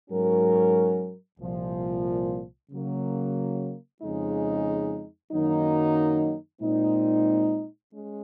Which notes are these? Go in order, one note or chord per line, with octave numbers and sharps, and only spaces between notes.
G#2 F#3 C#4 F#4 A#4
C2 A#2 F3
C#3 F#3 A#3
F2 C#3 G#3 D#4
F#2 D#3 F#3 A#3 D#4
A#2 G#3 C4 D#4
G#3 C#4